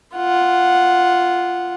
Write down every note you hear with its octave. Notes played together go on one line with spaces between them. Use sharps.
F4 F#5